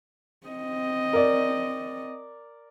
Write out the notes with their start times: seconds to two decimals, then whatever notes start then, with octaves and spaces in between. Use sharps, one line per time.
0.47 C4 D#5
1.13 A#4 D5